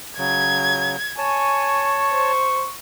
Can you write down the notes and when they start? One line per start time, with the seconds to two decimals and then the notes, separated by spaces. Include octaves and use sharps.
0.18 C#3 F#3 G#6
1.18 C#5 G#5 A5 C#6
2.11 C5